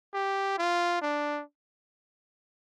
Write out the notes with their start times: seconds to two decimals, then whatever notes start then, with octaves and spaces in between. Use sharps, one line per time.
0.14 G4
0.58 F4
1.02 D4